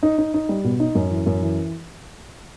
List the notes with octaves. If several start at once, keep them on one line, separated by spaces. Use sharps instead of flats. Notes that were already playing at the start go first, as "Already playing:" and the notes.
D#4
D#4
D#4
G3
B2
D#4
F#2
E3
F#2
E3